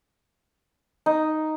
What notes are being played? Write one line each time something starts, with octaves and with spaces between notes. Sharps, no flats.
D#4